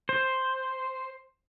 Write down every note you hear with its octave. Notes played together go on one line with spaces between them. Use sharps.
C5